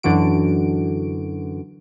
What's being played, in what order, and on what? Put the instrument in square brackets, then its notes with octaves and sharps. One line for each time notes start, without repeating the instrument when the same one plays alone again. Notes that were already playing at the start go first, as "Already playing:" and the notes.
[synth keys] F#2 D3 E3 F#4 D7